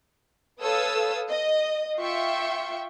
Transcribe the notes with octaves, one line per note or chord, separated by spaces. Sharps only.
A4 B4 C#5 F5 D#6 E6
D#5
F4 E5 G5 C#6